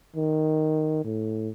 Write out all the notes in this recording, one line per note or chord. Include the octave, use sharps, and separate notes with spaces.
D#3
A2